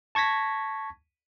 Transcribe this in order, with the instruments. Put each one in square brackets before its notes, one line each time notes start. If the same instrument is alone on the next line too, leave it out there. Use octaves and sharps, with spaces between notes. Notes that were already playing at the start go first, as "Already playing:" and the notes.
[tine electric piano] A5 C#6 G#6 A#6 B6